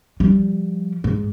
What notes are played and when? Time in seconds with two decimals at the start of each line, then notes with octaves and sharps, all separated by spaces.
0.20 F3 G3
1.04 G#2